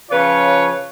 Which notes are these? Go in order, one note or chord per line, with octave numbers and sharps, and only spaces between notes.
C#3 F3 F4 B4 C#5